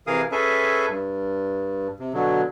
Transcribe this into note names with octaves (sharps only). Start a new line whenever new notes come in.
C3 E3 G#4 A#4 F5 D#6
C#4 G#4 A4 B4 E5 G#5
G2
C3
B2 D3 F#3